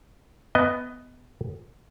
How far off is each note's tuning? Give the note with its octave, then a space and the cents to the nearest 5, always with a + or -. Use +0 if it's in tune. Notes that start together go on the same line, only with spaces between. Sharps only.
B3 +15 D#5 +0